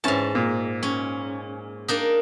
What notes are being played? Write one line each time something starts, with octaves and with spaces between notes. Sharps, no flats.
G#2 E3 C#4 A5
A#2
C#4
A#3 D4 D#4